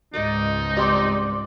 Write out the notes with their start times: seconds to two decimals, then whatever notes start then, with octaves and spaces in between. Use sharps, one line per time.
0.14 C#2 G#2 G#3 D#4 D5 D#5 D6
0.77 G3 C4 D5 C6 D6